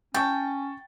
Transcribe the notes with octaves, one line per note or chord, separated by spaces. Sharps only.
C#4 G5 A5 C#6 A6